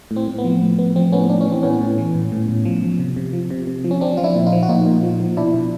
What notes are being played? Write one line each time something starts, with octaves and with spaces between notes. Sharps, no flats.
A2
C4
A2
B3
F3
A2
A2 B3
F3 C4
A2 B3 C#4
A2 D4
C#4
E3
C4
A2 B3 C#4
A2
E3
A2
A2
A2
F3
F3
C3
C3
F3
C3
C3
F3
C#4
F3 C4 D4
F3 F4
D4 E4
A#2
D#4 F4
F3
F#4
A#2 D#4 F4
A#2
F3
F3
B2 D4 E4
B2